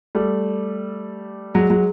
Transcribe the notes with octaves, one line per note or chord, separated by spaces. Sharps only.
G3 A3
F#3 G#3
F#3 G#3